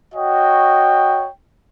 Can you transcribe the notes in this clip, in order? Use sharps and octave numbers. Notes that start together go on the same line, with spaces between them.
F#4 C#5 D#5 G5